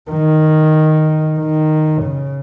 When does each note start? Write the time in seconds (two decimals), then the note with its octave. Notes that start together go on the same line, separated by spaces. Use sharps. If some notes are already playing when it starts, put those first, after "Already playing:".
0.11 D#3
1.39 D#3
2.02 C#3